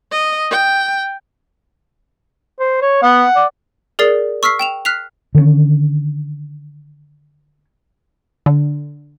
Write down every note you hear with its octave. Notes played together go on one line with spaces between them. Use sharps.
D#5
G5
C5
C#5
B3 F#5
D5
G#4 A#4 D5 D#6 A6 C7
C#6 E6 F6 B6 C7
G5 E7 F7
F6 F#6 B6 C7 F7
D3 D#3 G3 C#4
D3